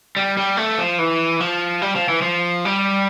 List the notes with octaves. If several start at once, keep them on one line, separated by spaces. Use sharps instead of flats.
G3
G3
A3
F3
E3
F3
G3
F3
E3
F3
G3